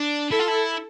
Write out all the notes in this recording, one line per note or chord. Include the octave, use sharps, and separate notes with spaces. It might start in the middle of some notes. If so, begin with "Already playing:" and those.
Already playing: D4
E4 A4
F4
E4